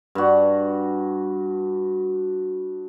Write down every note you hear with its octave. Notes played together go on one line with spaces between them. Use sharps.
G2 F#4